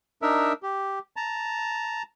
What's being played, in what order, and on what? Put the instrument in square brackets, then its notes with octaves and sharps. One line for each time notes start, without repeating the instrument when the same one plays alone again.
[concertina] D4 D#4 A#4 E5
G4
A5 A#5